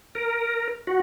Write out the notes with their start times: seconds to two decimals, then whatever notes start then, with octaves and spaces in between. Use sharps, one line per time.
0.15 A#4
0.87 F#4